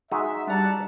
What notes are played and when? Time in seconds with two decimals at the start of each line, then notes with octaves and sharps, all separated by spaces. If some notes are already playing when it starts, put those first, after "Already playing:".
0.11 G#3 D#4 F#4 E5
0.47 G3 D4 F#5 A5 A#5